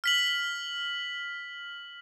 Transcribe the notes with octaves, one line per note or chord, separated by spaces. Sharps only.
F6 B6 F#7